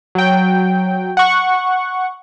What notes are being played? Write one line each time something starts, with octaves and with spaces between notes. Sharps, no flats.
F#3 G5
F#5 C#6